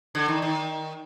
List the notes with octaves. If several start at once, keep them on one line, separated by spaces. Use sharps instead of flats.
D3
D#3
D#3